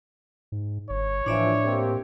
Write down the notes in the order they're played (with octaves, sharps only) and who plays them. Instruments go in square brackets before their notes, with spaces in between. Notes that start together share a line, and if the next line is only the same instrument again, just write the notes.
[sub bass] G#2
[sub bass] G1 [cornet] C#5
[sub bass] A2 [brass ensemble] E3 F3 [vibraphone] D4 D5 E5
[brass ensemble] A#3 C4 G4